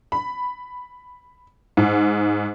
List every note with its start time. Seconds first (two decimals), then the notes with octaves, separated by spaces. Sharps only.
0.12 B5
1.77 G#2